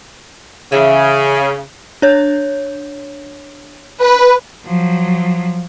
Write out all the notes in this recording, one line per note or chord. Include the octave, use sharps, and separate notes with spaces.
C#3 E3 G#4 E5
D4 C#5 G6
B4
F3 F#3